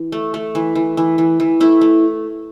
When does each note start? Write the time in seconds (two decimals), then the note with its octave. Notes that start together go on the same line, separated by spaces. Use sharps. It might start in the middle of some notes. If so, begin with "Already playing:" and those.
Already playing: E3
0.12 A3
0.34 A3
0.55 E3
0.75 E3
0.97 E3
1.18 E3
1.40 E3
1.60 A3 E4
1.81 A3